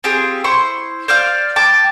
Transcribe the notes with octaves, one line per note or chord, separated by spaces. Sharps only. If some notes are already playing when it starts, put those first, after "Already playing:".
C4 F4 G4 G#4
E4 C5 C6 C#6
C5 D5 F5 F6
G5 A5 D6